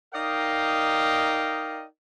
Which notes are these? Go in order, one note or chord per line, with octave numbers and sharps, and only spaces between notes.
D#4 A#4 D5 D#5 F5 G5